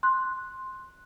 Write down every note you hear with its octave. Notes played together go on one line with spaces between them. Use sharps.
C6 F#6